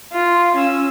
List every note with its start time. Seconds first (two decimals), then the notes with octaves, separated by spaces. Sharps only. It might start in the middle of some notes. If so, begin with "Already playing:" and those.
0.13 F4
0.56 C#4 E6